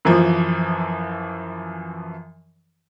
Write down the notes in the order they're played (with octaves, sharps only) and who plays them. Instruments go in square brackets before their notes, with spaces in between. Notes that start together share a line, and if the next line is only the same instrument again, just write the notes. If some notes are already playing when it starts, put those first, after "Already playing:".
[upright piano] F#2 E3 F3